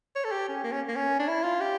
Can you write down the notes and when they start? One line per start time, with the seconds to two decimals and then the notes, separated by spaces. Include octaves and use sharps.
0.16 C#5
0.24 A4
0.31 G4
0.48 C#4
0.64 A#3
0.72 C#4
0.88 A#3
0.96 C#4
1.19 D4
1.28 E4
1.44 F4
1.60 G4